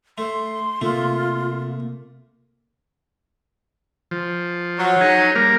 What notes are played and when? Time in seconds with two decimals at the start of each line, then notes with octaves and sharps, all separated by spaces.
0.18 A3 C6
0.81 C3 A3 A#3 F4
4.11 F3
4.79 F#3
5.01 D#4 G#4 C#5
5.35 G3 A#3 A#4